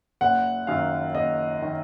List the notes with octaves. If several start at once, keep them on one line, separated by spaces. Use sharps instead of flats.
F#1 F#5
F#2 D#3 F5
F#1 D#5
D#3